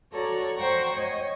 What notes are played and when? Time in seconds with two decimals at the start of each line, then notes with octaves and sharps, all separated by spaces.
0.13 F#4 A4 C#5 D5 A#5
0.56 C5 F#5 G5 A#5 C#6
0.93 C#5 D#5